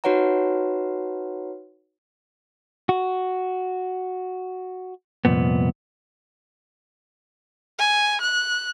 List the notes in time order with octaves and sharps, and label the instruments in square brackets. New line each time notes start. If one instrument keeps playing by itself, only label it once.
[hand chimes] D#4 F#4 B4 C#5 F#5 A#5
[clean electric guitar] F#4
C2 F2 A#2 B3
[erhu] G#5
F#6